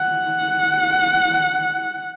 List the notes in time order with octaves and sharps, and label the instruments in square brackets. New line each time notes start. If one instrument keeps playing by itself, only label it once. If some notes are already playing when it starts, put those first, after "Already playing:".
Already playing: [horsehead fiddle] F#5